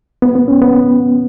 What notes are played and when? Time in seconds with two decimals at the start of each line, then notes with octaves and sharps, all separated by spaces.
0.22 B3
0.35 B3
0.48 C#4
0.62 B3